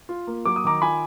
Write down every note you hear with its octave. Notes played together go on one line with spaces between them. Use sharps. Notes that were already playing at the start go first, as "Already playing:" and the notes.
F4
A#3
F#3 D6
D#6
D#3 A#5 D6
F4 G#5 B5